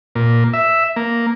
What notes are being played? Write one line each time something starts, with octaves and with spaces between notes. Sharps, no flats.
A#2
E5
A#3